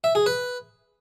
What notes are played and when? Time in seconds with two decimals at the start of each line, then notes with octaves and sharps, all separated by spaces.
0.04 E5
0.15 G#4
0.26 B4